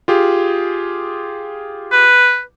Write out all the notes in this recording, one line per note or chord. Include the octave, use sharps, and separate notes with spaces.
F4 G4 G#4
B4